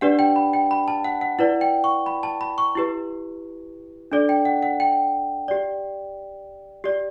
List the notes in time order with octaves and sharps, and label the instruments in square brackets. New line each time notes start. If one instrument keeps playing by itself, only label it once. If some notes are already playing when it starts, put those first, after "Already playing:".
[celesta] D4 G4 B4 D5 F#5
G5
B5
G5
B5
A5
F#5
F#5
E4 B4 D5 F#5
G5
C#6
B5
A5
B5
C#6
E4 G4 B4
D4 A4 D5
G5
F#5
F#5
G5
G4 D5
G4 D5